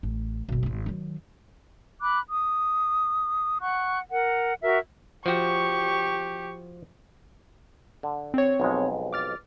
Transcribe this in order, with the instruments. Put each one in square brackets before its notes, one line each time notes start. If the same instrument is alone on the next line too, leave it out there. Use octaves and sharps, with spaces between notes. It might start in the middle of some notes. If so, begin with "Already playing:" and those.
[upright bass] A1
F#1 B1
D#1 G#1
D#3 F#3
[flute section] B5 D6 F#6
D#6
F#5 C#6 F#6
A#4 F#5
F#4 A#4 E5
[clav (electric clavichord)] F3 F#4 [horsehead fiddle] G4 [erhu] C#6
[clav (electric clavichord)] D3
[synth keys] C4 C#5
[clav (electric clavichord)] B1 F2 G#3
[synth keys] D6 F6 A6